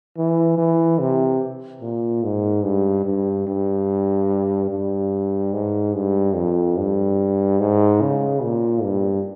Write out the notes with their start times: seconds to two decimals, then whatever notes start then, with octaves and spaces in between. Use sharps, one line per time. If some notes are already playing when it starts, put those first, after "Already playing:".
0.17 E3
0.58 E3
0.99 C3
1.81 A#2
2.23 G#2
2.64 G2
3.06 G2
3.47 G2
4.70 G2
5.53 G#2
5.94 G2
6.35 F2
6.77 G2
7.60 G#2
8.01 C#3
8.43 A#2
8.84 G2